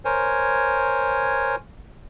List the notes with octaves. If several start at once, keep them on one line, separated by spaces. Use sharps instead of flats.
A#4 C5 C#5 G#5